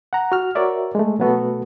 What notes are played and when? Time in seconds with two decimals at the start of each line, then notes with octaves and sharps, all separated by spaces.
0.13 F#5 A#5
0.32 F#4 F6
0.55 F#4 A#4 C#5 D5 E5
0.95 G#3 A3
1.19 B2 F#3 A3 B3 F#4 A4